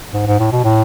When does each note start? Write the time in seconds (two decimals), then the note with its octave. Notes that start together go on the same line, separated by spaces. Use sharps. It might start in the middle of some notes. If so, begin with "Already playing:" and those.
0.14 G#2
0.27 G#2
0.39 A2
0.52 B2
0.64 A2